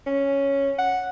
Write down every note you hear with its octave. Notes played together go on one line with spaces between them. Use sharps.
C#4
F#5